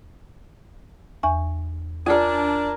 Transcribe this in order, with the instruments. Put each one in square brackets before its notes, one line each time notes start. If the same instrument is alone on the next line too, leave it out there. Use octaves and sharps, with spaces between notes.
[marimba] E2 G#5 C#6
[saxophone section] D4 [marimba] F4 D5 [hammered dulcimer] A#4 G#5